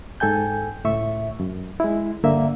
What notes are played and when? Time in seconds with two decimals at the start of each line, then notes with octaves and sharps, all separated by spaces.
0.20 G#2 A4 G5 G#5 G6
0.84 C#2 A2 E5 C#6
1.40 F#2
1.80 G#3 E4
2.24 G2 D3 A#3 E5